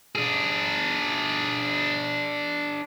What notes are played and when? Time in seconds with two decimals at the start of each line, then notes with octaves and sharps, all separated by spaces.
0.15 D4 G#4